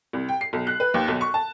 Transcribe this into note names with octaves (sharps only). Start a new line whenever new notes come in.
C2
G5
C7
B1
F#6
B4
D#2
B1
C#6
A5